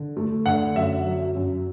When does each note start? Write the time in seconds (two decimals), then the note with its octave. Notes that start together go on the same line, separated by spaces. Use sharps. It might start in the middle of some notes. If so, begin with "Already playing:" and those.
Already playing: D3
0.17 A3
0.46 D3 F#5
0.76 F#2 E5
1.06 F#3
1.35 F#2